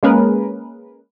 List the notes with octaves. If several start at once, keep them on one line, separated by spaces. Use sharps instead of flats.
G#3 A#3 C#4 G#4 A#4 B4